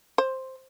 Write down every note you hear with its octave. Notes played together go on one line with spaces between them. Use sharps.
C5